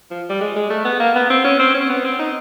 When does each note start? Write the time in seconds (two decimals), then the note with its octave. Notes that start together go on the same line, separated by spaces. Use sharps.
0.11 F3
0.29 G3
0.41 G#3
0.56 G#3
0.70 A3
0.85 B3
1.00 A#3
1.16 B3
1.30 C4
1.45 C#4
1.60 C4
1.75 C#4
1.89 B3
2.05 C4
2.19 D#4